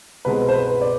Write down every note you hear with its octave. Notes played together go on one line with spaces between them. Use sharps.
C2 B2 G#3 C4 B4
C5
B4
D5